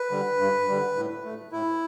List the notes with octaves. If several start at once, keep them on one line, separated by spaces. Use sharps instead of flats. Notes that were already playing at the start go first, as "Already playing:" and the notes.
Already playing: B4
D3 G3
G2
D3 G3
A2
A3
A2 E4